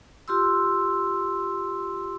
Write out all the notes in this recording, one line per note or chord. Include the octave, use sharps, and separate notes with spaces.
F4 G4 C6 E6